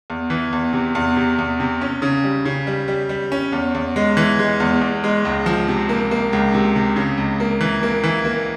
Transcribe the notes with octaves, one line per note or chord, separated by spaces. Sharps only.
E2
E3
E2
C3
E2
C3
E2
C3
C#4
C#3
G3
C#3
G3
G3
G3
C#4
E2
E2
G#3
E3
G#3
E2
E2
G#3
C#2
F3
C3
A#3
A#3
C#2
C3
C3
C#3
C#2
A#3
E3
A#3
E3
A#3